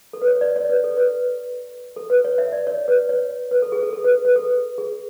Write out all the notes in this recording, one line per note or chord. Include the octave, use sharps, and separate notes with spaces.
A4
B4
C#5
D5
C#5
B4
A4
B4
A4
B4
C#5
E5
D5
C#5
B4
C#5
B4
A4
G#4
A4
A4
B4
B4
A4
G#4